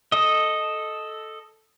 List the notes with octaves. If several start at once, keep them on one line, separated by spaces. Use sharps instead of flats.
A4 D#5